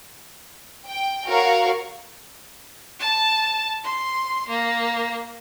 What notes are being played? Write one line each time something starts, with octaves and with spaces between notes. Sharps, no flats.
G5
F#4 A#4 C#5 F5 C#6
A5
C6
A#3